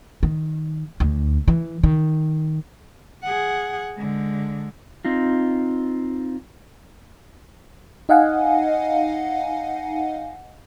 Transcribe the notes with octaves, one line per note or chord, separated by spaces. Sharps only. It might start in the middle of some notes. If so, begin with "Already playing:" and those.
D#3
D2
E3
D#3
G#4 F#5
D3 G#3
C4 D#4 F4
D#4 D#5 F5 F#5 G#5